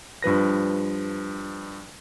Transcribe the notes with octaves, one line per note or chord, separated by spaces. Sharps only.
G2 F3 B4 A#6